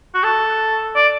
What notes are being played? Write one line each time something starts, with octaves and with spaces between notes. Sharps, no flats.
F#4
A4
D5